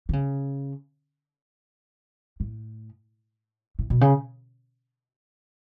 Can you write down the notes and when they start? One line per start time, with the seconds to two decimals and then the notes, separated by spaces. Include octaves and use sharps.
0.09 D3
0.13 C#3
2.40 A2
3.79 A2
3.90 B2
4.01 C#3